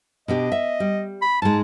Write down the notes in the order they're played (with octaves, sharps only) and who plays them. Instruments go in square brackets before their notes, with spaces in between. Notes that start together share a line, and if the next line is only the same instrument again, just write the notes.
[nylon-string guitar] B2 D4 G4 [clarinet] D#5
[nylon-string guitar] E5
G3
[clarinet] B5
[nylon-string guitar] G#2 G#3 [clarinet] A5